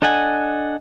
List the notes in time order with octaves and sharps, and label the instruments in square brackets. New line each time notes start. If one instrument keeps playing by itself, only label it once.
[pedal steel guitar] D4 A4 D#5 F#5 G#5